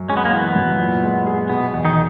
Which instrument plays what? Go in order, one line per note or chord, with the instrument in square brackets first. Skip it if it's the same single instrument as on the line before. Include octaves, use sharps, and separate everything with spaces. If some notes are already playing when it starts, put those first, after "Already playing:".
Already playing: [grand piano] F#2
[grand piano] G#3 [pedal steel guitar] C#4
[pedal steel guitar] B3
A#3
[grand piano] E3 [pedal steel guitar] B3
[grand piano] F#2
A#2
G#3
G#4
[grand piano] B2 [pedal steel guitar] B3
[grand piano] E2
[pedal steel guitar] D#3 D#4